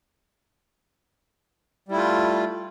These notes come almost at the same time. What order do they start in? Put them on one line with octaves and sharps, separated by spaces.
G3 E4 A3 F4